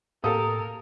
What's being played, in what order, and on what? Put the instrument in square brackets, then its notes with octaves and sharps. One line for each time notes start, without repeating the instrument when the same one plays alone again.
[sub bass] A2 [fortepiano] A#3 G4 A4 [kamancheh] A#4 [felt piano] D#6